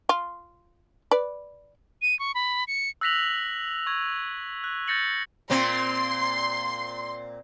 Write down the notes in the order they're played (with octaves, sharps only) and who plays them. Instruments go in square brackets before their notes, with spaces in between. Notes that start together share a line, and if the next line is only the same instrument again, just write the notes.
[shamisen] F4
B4 D5
[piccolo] D#7
C#6
B5
C#7
[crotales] E6 F#6 A#6 B6 F7 F#7
C#6 G#6
F#6
G6 A6 A#6 C#7 F#7
[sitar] A#2 A#3 C4 [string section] C6